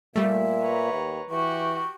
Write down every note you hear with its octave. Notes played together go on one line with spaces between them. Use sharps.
A#2 G3 A3 E5
B4 C#5 A#5
D#2
E3 F#4 G4 C#6